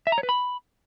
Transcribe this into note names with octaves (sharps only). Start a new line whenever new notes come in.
E5
A#5
C#5
B4
B5